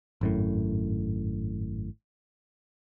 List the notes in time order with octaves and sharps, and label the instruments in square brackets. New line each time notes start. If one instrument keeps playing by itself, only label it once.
[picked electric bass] G#1 F#2 A2